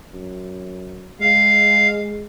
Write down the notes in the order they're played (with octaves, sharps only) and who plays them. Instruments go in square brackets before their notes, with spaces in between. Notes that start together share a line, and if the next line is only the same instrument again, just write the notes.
[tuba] F#2
[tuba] G#3 [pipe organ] F5